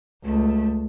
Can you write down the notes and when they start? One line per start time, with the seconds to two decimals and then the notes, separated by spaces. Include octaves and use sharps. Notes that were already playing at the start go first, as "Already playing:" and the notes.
0.24 C#2 A3